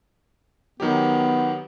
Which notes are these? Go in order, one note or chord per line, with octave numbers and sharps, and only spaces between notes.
D#3 F#3 B3 G4